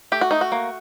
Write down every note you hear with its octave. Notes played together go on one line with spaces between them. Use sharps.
A3 G4
F#4
A3 D#4
F#4
A#3